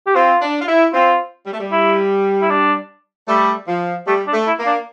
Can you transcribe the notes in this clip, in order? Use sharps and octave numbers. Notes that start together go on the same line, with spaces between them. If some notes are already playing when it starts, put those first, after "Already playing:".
G4
C4 F4
D4
F4
E4
C4 F4
G3
A3
G3
E4
E4
D4
G3 A3
F3
G3 A3
D4
A3
E4
A#3
D4